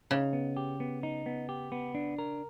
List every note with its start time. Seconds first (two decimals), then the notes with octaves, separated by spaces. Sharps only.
0.11 C#3 D#4
0.33 B3
0.57 G4
0.80 B3
1.03 D#4
1.26 B3
1.49 G4
1.72 B3
1.95 D4
2.19 A#4